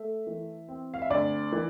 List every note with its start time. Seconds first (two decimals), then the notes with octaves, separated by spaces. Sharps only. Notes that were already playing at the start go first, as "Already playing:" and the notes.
Already playing: A3 E5
0.27 E3
0.68 C4
0.94 F5
1.02 E5
1.10 D2 D5
1.52 E3